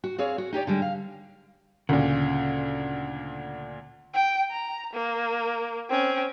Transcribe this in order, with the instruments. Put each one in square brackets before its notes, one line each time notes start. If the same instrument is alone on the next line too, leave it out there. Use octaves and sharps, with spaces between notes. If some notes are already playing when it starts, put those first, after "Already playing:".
[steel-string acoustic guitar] F#4
C4 G#4 C#5 F5
F#4
D#4 G4 C#5 D5
D3 G3 G#3
F5
[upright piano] D2 A#2 [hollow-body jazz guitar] C#3
[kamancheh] G5
A#5
A#3
C4 C#4